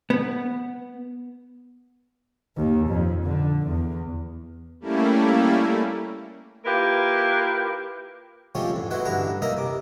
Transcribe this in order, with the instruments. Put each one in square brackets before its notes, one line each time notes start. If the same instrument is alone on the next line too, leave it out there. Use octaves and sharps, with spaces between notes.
[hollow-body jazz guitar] B3
[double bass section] D#2
F2
D3
E2
[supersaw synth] G3 A3 A#3 C#4 E4
[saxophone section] A#3 E4 F4 G4 A#4 B4
[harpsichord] F3 G#3 A3 C4 C#4 G4
E2 G#2
G#3 B3 E4 F#4 B4 C5
A1 G2 D3 D4 E4 A#5
D#2 A#3 D#4 A#4 D#5 E5
C3 D6